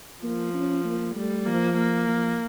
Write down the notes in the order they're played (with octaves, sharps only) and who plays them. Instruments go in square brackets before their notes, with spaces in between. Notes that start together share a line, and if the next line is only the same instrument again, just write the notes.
[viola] F3 [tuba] A#3
[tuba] C#4
A#3
[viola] G3 [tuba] A3
[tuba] F3 [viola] A#3
[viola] A#3
[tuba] F3